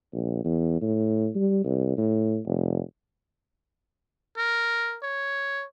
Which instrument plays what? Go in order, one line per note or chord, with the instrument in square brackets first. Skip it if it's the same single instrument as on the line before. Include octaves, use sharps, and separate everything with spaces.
[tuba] A#1
E2
A2
G3
C2
A2
F1
[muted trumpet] A#4
C#5